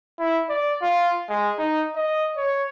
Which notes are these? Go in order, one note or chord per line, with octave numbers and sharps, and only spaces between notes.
E4
D5
F4
G#3
D#4
D#5
C#5